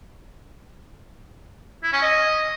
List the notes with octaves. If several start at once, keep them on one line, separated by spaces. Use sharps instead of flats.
E4
C#4
D#5